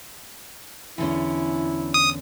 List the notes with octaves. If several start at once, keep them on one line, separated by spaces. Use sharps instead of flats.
E2 D3 C#4 E4
D#6